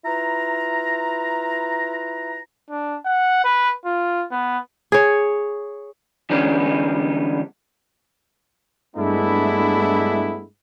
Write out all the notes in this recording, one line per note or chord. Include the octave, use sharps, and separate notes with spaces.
E4 F4 B4 A#5
D4
F#5
B4
F4
B3
G#4 C#5
D3 E3 G3 G#3 B3 C#4
G2 G#3 A3 B3 D4 E4